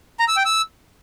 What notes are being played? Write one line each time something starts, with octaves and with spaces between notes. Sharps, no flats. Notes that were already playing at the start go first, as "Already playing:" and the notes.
A#5
E6
G5
E6